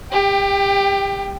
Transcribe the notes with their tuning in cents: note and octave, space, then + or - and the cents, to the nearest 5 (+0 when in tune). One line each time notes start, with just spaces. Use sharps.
G4 +25 G5 +0